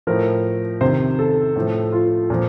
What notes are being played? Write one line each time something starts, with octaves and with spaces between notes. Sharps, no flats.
A2 F3 A#4
C3 D#3 C5
A4
A2 F3
F4
A#2 F3